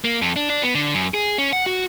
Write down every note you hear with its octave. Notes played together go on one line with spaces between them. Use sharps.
A#3
F2
D4
D4
B3
D3
F#2
G#4
C#4
F#5
F#4